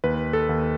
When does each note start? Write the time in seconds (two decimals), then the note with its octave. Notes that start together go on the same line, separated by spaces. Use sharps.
0.04 D#2 B4
0.33 A4
0.49 D#2